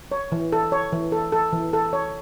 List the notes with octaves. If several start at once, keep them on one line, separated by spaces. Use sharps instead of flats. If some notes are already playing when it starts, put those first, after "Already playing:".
C#5
E3
A4
C#5
E3
A4
A4
E3
A4
C#5